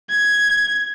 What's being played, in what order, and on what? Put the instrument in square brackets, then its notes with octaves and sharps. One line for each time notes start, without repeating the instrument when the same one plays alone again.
[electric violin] G#6